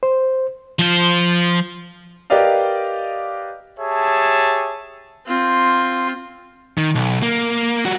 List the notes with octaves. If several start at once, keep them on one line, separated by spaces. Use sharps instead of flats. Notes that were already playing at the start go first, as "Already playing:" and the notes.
C5
F3 C5
G4 A#4 B4 D5 D#5 F5
G4 G#4 C#5 E5 A5
C4 F4
D#3
B1
A#3
G3 F#4